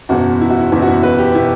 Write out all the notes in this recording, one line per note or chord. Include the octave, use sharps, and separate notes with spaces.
F#1 E2 B2 F#4
E4
F#4
E4
F#1 E2 B2 E4
F#4
E4
B4
G4
B2 E4